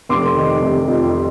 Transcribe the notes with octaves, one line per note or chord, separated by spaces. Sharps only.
F1 C6 D6
D#3
C3
F2